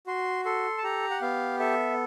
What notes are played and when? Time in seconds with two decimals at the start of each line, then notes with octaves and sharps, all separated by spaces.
0.07 F#4 C6
0.45 A4 C6
0.78 A5
0.84 G4 A#5
1.11 F#5
1.22 B3 F5
1.59 A4 E5